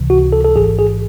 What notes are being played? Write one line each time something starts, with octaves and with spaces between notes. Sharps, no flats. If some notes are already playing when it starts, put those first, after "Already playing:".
Already playing: C#2 C3 E3
F#4
A4
A4
A1 G#2 E3 G#4
G#4